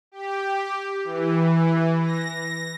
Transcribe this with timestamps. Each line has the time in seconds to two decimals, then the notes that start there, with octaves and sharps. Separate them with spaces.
0.12 G4
1.04 E3
2.03 A#6